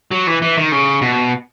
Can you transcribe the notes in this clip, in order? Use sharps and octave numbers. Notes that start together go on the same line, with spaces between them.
F#3
E3
E3
D#3
C#3
B2